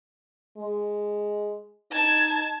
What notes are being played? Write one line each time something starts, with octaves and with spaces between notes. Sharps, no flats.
G#3
D#4 A5 G#6